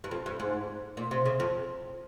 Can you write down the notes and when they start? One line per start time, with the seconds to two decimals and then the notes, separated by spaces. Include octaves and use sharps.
0.04 G2
0.11 F2
0.26 G2
0.40 G#2
0.97 A#2
1.11 C3
1.26 C#3
1.40 F2